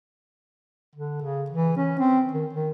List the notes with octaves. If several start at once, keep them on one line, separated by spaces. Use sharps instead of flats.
D3
C#3
E3
C#4
C4
D#3
D#3